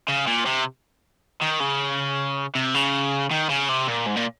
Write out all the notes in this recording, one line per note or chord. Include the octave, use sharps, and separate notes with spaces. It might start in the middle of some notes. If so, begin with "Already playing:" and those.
C#3
A#2
C3
D#3
C#3
C3
C#3
D#3
C#3
C3
A#2
G#2
A#2